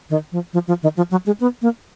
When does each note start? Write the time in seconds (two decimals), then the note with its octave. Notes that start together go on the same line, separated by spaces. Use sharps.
0.10 D#3
0.32 F3
0.53 F3
0.68 F3
0.83 D#3
0.97 F3
1.11 F#3
1.26 G#3
1.40 B3
1.62 A#3